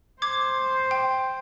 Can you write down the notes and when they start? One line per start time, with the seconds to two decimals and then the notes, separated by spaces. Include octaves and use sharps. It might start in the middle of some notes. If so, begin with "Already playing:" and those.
0.22 C5 D6 G#6
0.91 G5